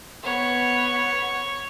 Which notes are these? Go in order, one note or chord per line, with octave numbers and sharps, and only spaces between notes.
B3 C#5